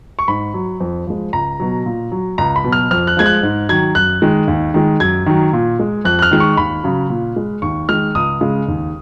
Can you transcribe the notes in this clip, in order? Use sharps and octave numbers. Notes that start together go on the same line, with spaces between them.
C#6
G#2 B5
F#3
F2
F3 G#3
C#2 A#5
B2 F#3
A#2
F#3
C#2 A#5
B5
B2 F#3
F6
F2 F6
F#6
F3 G#3 G#6
F#6
G#2
D#3 F#3 G#6
F#2 F#6
D#3 G#3
D#2
D#3 G#3
F#2 G#6
D#3 F#3
A#2
G#3
F2 F#6
F#6
F6
D#3 G#3
C#6
D#2 B5
C#3 F#3
A#2
G#3
D#2 C#6
D#3 G#3 F6
C#2 D#6
C#3 G#3
D#2